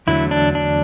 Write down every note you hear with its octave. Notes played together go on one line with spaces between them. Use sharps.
E2 D3 F#3 A3 E4
D4
D4